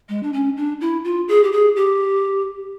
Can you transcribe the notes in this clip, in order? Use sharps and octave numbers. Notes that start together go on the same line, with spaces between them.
G#3
D4
C#4
D4
E4
F4
G#4
G4
G#4
G4